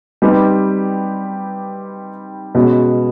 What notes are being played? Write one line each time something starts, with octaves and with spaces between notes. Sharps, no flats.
G3 C4 D#4 G4 B4
B2 G#3 C#4